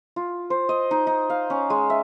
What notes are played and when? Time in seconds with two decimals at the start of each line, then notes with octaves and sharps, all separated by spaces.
0.16 F4
0.50 C5
0.69 D#5
0.91 D#4
1.07 D#4
1.30 F5
1.50 C#4
1.70 G#3
1.90 E5